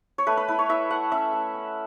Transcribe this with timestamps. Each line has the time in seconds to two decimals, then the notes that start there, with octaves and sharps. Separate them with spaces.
0.18 C#5
0.27 A3 B4
0.37 B4
0.48 E4 B4
0.59 C#5
0.69 E4 E5
0.90 A3 F#5
1.12 C#4 E5
1.33 A3
1.54 C#4